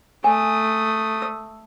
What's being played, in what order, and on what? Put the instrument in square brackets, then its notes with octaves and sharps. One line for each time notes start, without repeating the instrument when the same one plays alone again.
[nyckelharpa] A3 D#6 [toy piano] G#5
[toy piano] E6